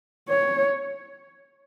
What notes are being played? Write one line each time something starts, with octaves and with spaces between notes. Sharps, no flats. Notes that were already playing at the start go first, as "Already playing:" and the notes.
C#5